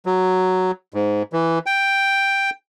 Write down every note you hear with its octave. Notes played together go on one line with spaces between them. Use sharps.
F#3
G#2
E3
G5